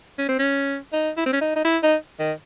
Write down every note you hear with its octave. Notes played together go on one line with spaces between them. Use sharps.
C#4
C4
C#4
D#4
E4
C4
C#4
D#4
D#4
E4
D#4
D#3